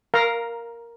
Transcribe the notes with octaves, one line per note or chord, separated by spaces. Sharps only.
A#4 F5 A#5